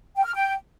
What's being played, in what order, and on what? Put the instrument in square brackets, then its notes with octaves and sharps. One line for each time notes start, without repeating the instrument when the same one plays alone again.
[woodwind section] G5
F6
G5